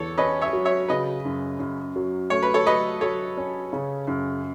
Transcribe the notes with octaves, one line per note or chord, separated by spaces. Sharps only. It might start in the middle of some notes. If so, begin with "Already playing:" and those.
Already playing: E2 A4 C#5
C#4 B4 D#5
C#5 E5
F#3
C#5 E5
C#3 B4 D#5
F#2
F#2
F#3
A3 C#5
B4
A4 C#5
F#3 B4 D#5
F#3 A4 C#5
C#4
C#3
F#2